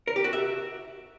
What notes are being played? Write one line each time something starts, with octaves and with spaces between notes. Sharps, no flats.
A#4
G4
F#4
E5